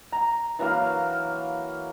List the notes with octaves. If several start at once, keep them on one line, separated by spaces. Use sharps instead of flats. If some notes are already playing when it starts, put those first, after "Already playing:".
A#5
E3 F#3 A#3 F5